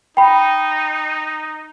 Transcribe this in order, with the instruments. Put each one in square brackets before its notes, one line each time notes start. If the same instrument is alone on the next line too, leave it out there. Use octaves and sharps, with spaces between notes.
[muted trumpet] D#4 [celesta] G5 B5